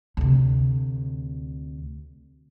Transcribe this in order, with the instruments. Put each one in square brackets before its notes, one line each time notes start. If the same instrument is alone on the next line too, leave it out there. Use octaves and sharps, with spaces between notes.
[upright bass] D2 C3